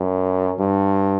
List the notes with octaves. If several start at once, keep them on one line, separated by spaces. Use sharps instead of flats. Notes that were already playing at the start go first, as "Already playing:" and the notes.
Already playing: F#2
G2